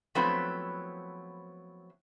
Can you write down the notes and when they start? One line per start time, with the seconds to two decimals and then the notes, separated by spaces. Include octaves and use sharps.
0.15 F3 F#3 A3 B3 C4 E4